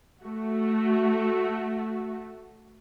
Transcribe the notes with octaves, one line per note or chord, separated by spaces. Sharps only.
A3 F#4